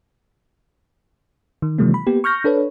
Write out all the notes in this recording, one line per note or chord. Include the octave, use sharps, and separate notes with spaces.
D#3
C3 D#3 E3 F#3 G#3 A#3
B5
A#3 B3 G4
C#6 F6 G6 A#6
D4 A4 B4 C#5